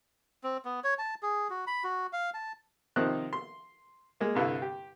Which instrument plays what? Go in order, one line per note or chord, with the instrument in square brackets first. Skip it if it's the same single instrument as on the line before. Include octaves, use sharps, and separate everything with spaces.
[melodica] C4
B3
C#5
A5
G#4
F#4
B5
F#4
F5
A5
[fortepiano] C3 D#3 F3 D#4 C5 F#6
C6
G#3 A#3
C2 G2 D3 E4 F5
G4